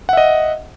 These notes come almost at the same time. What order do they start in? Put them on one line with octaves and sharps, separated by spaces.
F#5 E5 D#5